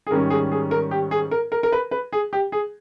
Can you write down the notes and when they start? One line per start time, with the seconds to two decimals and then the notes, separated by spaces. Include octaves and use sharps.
0.07 G#4
0.11 G#2 D#3 G3 C#4 A#4
0.30 G#4
0.52 G#4
0.71 A#4
0.91 G4
1.11 G#4
1.31 A#4
1.52 A#4
1.63 A#4
1.72 B4
1.91 B4
2.13 G#4
2.33 G4
2.52 G#4